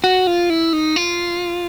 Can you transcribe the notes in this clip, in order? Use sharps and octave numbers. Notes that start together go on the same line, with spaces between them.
F#4
F4
E4
D#4
F4